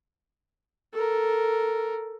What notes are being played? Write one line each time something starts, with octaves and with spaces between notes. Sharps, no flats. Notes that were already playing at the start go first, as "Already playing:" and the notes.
A4 A#4